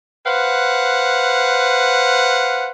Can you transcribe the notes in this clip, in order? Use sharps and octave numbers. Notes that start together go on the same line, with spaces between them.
B4 C5 F5 F#5